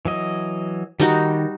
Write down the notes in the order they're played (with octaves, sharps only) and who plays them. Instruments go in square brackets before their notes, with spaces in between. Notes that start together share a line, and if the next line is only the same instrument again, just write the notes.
[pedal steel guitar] E3 F#3 D#5
[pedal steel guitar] D#3 [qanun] G3 D#4 F#4